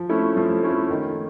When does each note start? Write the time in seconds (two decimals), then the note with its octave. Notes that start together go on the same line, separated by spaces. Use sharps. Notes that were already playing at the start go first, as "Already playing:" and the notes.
Already playing: F3
0.09 A3 C#4 E4
0.37 F3
0.63 A3 C#4 E4
0.91 D#3